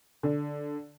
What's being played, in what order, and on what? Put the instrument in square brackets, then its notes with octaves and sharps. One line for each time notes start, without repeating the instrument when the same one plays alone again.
[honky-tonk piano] D3